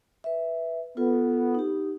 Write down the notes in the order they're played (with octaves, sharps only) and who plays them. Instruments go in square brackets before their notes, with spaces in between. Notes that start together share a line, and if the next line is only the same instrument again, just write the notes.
[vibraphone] B4 E5
[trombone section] B3 [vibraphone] F4 A4 B4
[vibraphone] D#4 G4